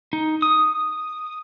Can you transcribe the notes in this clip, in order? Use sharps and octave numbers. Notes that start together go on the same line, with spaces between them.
D#4
D#6